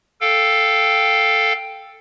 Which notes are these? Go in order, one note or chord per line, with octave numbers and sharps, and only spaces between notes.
A4 F5 G5